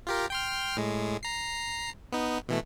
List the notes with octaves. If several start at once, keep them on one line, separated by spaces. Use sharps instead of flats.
F4 G4 A#4
G5 C6 F6
A2 G#3
A#5 C7
B3 D#4
B2 E3 A3